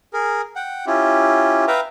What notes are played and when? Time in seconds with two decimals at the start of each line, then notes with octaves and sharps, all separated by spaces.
0.14 G#4 A#4
0.56 F#5 G5
0.87 C#4 E4 F4 G4
1.68 B4 E5 F5 G5 A#5